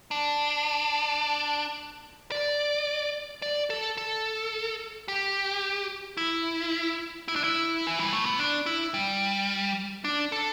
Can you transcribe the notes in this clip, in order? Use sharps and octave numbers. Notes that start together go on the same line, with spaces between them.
D4
D5
D5
A4
A4
G4
E4
E4
D4
E4
E3
G3
A3
B3
D4
E4
G3
D4
A4